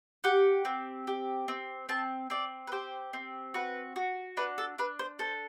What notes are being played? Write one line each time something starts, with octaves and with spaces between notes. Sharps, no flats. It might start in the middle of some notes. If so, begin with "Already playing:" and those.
G4 F#5
C4
G4
C4
C4 A5
C4 D5
B4
G4 C5
C4
F#4 B4
F#4
D4 B4
A4
D4 B4
C5
A4 C5